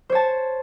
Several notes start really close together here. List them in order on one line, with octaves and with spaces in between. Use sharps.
C5 C#5 A5